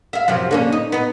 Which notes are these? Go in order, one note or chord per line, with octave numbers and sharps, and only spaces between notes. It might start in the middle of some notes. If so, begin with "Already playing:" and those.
E5 F5
F#2 C3 F3
D3 A#3 C#4
D#4
B3 D#4